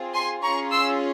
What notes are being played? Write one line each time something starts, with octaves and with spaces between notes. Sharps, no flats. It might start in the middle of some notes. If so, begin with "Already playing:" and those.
Already playing: C4 F4 G#4
G#5 C6
C#4 F4 G#4 A#5 C#6
C6 E6